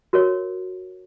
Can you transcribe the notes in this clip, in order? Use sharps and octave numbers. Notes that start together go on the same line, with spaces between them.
F#4 A#4 C#5